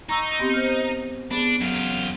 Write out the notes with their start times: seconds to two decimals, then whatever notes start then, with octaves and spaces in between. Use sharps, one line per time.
0.09 D#4 A#5 C#6 E6
0.39 B3 C4 G4
0.54 C5 F6
1.31 B3 D4 G#4
1.60 F#2 F4